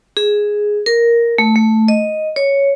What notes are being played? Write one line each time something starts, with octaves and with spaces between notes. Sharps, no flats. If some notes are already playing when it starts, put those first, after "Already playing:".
G#4
A#4
A3
A3
D#5
C#5